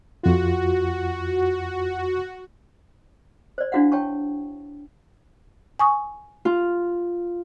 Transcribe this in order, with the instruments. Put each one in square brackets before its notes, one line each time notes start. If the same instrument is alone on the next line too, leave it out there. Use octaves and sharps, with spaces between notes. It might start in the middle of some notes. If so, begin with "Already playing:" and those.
[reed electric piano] F2 F4 [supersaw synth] F#4
[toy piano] C5 D5
D4 E4 F#4 F5 F#5
C#5 G5 A5 C#6
[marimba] G#5 C#6 D#6
[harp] F4